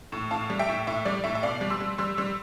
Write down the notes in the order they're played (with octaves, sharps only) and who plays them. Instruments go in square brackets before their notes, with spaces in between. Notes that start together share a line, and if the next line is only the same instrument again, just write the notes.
[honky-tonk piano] A2
A2 F5 A5
G3
E5 G5
A2
A2 E5
G3 D5
A2 E5
E5
B2 D5 F5
G3
C6 E6
G3
G3 C6 E6
G3 C6 E6